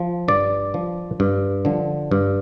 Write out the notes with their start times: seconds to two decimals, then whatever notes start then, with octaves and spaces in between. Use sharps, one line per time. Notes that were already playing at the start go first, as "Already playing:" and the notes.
Already playing: F3
0.28 G2 D5
0.74 F3
1.20 G2
1.65 D3 F3
2.11 G2